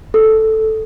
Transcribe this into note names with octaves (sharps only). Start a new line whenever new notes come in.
A4